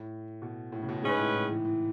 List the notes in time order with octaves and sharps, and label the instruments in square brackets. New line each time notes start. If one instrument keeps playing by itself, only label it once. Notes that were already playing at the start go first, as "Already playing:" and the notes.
Already playing: [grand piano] A2
B2
A2
C#3
B2
A2
[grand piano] G#2 [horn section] G#3 C#4 G#4 B4
[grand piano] A2
A2
E3
E3